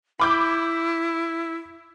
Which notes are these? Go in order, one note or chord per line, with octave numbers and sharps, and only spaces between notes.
E4 B5 D6 G6